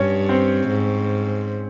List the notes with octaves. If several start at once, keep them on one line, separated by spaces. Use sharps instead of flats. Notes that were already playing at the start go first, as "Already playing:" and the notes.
Already playing: G2 C#4 C#5
C4 C5
G#2